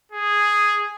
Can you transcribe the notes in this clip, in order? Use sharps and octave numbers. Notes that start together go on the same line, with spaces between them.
G#4